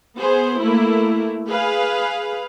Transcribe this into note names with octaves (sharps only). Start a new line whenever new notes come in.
B3 G#4 C5
A3 A#3 E4
G#4 B4 F5